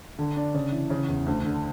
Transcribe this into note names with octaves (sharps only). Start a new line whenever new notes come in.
D3
D4
C#3
E3
C#3
E2
D2
D3